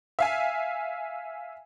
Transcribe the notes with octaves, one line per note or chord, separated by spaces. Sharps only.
E5 F5 G#5